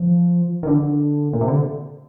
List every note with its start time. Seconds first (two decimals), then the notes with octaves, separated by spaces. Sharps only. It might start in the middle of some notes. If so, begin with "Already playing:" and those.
Already playing: F3
0.63 D#3
0.67 D3
1.33 A#2
1.41 C3
1.48 D3